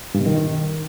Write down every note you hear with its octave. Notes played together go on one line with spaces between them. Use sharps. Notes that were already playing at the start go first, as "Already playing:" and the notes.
G2
B2
D#3